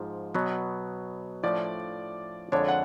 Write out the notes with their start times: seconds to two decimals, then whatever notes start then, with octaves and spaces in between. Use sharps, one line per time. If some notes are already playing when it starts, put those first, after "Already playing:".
Already playing: G#2 F3
0.35 B2 F#3 B3
1.43 A2 F3 A3 D4 D5
2.52 F2 D3 G#3 D4 C#5
2.68 F#5